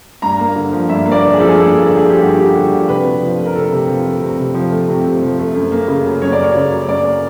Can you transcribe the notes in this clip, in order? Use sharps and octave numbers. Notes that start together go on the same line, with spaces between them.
G2 A#5
A#3
D3
F3
G2 E5
A#3
D5
D3
G#4
F3 A4
G#4
G2 A4
A#3
A4
D3
G#4
F3 G4
G2 F#4
A#3 G4
D3 F#4
F3 F#4
C3 B4
C3
F3
A3
A#4
C3 A4
C3
F3
A3
C3
C3
F3
A3
C3
C3
F3
A3
F#2
A#3
C#3
F#3
F#2 C#5
D5
A#3
C#5
C#3
F#3
F#2 D5
A#3